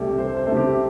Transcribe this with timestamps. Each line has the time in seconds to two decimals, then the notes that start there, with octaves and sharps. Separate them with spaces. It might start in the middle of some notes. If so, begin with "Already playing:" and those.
Already playing: C2 C3 A3 G4 A4
0.18 C2 C5
0.37 C5
0.47 A3
0.52 C3 G4